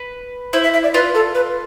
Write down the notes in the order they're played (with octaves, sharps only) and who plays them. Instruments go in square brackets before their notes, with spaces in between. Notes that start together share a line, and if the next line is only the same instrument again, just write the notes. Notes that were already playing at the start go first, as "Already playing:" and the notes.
Already playing: [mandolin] B4
[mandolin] E4 [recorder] C5
[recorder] E5
E5
D5
[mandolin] F4 [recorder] B4
[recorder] A4
B4